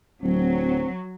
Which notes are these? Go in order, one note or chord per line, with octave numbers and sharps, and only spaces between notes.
D1 F#3 C4